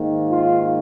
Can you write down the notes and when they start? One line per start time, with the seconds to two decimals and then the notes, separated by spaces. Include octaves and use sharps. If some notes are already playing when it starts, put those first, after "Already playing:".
Already playing: G#2 D#3 A#3
0.29 F4